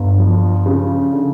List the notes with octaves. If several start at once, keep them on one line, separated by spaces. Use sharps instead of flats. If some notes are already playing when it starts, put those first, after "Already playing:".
Already playing: G1
F3
C#3
D3